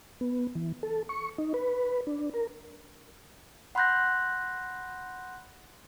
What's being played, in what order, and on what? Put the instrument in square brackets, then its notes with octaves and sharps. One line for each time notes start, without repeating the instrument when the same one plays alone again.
[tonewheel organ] B3
E3
A4
C#6
D#4
B4
D4
A#4
[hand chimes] F#5 B5 C6 F#6 G6 A#6